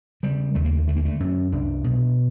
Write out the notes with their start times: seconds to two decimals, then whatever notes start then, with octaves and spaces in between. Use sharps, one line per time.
0.23 C#3 G3
0.55 D#2 A3
0.65 A#3
0.75 A3
0.87 D3 A3
0.96 A#3
1.05 A3
1.20 F#2 C#4
1.52 C2 D4
1.84 B2